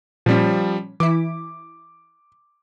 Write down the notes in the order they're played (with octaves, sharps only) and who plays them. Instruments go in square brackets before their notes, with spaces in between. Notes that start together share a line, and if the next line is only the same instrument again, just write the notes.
[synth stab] A#2 C#4 [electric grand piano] F3 G3
[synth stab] E3 E4 [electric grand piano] D6